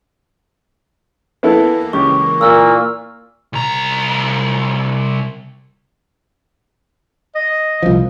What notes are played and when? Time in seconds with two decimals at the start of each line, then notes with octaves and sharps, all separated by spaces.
1.43 E3 A#3 B3 E4 A4
1.93 C#2 G4 C#6
2.41 A#2 E6 F6
3.53 C2 A#5
7.35 D#5
7.82 C2 F3